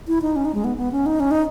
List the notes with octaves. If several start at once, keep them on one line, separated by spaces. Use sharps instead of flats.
E4
D#4
C#4
D#4
G#3
B3
B3
C#4
D#4
C#4
D#4